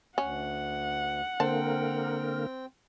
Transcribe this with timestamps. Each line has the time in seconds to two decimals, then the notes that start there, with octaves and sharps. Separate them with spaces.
0.18 D2 C#4 F#5
1.40 D3 A#3 C4 A#4 C5 G5 A5